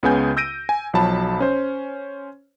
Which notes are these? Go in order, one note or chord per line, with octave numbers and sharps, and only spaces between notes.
C#2 C#3 B3 G#4 G#5 G6
E6 G6 A#6 D7 D#7
G#5
B1 F3 F#3 A5 B5
C#4 C5